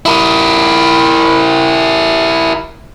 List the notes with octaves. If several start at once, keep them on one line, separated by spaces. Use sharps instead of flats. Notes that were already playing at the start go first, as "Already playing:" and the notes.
E4 A#4